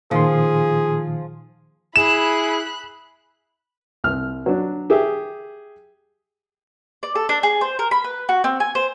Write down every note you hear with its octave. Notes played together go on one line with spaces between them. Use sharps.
A#2 D#3 F3 G#4 C6
E4 G#4 B5 F#6 E7
C2 F6
F#3 D4
G4 G#4 E5
D5
A4
D4
G#4
C5
A#4
B5
B4
F#4
C4
G#5
C5